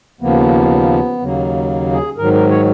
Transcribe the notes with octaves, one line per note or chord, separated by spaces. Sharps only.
D#2 C#3 F3 A#3 B3
D#2 C#3 F#3 A#3
G#4
G#2 D#3 F#3 A#4
A#4
C#5